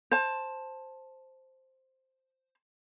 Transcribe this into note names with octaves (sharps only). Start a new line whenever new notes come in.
C5 A5